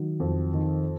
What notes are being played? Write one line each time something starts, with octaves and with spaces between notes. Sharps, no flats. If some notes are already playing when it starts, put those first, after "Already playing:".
Already playing: D#3 F#3
F2
D#3